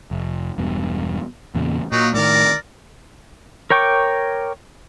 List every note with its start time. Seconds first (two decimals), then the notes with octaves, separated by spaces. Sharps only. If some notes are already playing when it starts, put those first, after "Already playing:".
0.11 F1
0.58 E1 G2 B2
1.55 E2 A#2 C#3
1.92 A#2 F#3 D#4
2.14 A2 C3 D#3 A#4 D5
3.70 A#4 C#5 G5 C#6 D6